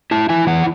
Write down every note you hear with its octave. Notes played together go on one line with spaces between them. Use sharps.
E4 A5
E4 G#5
E3 F#5